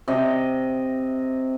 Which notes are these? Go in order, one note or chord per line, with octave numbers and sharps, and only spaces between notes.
C3 D#5